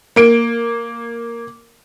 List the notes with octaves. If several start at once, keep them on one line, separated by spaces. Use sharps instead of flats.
A#3 D7